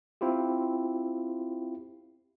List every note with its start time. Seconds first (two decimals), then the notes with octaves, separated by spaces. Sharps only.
0.21 C4 E4 F4 G4